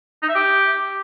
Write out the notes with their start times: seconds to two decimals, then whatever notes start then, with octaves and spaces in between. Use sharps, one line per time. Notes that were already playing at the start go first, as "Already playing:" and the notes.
0.22 D#4
0.29 E5
0.35 G4